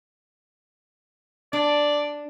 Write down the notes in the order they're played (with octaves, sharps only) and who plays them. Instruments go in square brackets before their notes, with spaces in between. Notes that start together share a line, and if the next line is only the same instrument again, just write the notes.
[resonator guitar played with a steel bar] D4 [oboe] D5